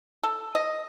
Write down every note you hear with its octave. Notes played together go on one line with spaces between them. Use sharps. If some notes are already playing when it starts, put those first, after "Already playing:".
A4
D#5